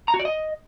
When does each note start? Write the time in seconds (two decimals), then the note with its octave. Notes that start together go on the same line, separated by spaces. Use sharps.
0.08 A#5
0.14 F#4
0.19 D5
0.25 D#5